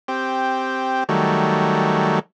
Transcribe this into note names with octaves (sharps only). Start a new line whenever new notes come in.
C4 G4
D#3 F#3 G3 A3